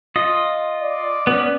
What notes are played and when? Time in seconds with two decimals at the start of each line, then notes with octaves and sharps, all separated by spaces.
0.16 F4 D#5
0.83 D5
1.27 B3 C#4